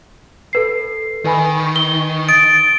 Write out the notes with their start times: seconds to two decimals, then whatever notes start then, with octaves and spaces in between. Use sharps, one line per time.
0.53 A4 B4 C7
1.25 D#3 B4 G#5 B5
1.76 G7
2.29 D#6 A6 D7